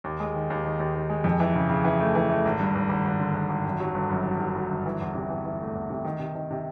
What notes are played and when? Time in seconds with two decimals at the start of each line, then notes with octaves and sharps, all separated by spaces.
0.04 D#2
0.20 G#3
0.35 D#3
0.50 D#2
0.65 D#3
0.80 D#2
0.95 D#3
1.09 G#3
1.24 F2
1.40 E3
1.55 C#3
1.69 C#3
1.85 E3
2.00 A3
2.15 E3
2.30 A3
2.45 G#1
2.60 G2
2.75 G#1
2.89 G#1
3.05 G#1
3.20 D3
3.35 G#1
3.50 G#1
3.65 F#2
3.80 F#3
3.94 G1
4.10 F#2
4.25 F#3
4.40 F#3
4.55 F#3
4.71 G1
4.86 E3
5.00 E2
5.15 C3
5.30 E3
5.45 E3
5.60 A3
5.75 E2
5.90 C3
6.04 D#3
6.20 C3
6.35 D#3
6.51 C3